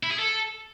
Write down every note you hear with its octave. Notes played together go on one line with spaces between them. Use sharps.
E4
G#4
A4